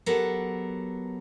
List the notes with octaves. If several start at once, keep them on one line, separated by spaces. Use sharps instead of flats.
F#3 B3 G4 A4 A#4 F#5